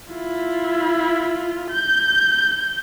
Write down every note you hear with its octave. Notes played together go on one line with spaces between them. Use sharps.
E4 F4
G6